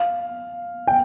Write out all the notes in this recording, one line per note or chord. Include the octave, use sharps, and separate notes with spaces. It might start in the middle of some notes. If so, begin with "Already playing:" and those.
Already playing: F5
G5